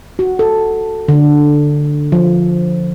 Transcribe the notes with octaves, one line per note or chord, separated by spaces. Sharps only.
F#4
A4
D3
F3